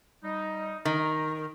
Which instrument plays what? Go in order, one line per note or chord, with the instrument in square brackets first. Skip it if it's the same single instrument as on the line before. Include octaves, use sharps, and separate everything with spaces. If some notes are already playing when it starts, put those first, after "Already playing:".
[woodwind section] G3 D#4
[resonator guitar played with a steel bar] D#3 [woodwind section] A#5